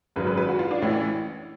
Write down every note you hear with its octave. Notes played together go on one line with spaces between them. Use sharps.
G#1 F#2 C#3 F#3 B4
B4
B4
F#4
F4
D4
A1 A2 E3 C#4